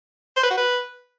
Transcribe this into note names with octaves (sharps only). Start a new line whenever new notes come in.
C5
B4
F#4
B4